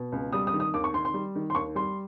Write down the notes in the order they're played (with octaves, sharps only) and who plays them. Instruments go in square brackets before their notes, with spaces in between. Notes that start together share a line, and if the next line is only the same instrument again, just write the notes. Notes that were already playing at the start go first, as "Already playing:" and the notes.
Already playing: [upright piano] B2
C#2
G3 D#6
D#6
D#3
D#6
D#2 D6
C#6
D#3 C6
C6
G3
D#3
C6
D#2 C#6
G3 C6